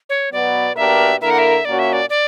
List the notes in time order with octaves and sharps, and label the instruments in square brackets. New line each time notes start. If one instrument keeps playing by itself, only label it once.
[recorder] C#5
[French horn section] B2 F#3 B3 [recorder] D5
[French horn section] B2 A#3 D4 G4 A#4 [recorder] E5
[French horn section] D3 A#3 E4 A#4 [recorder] E5
[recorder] F#5
E5
[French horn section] A#2 A#3 C#4 F#4 [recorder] D5
[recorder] E5
D5
D5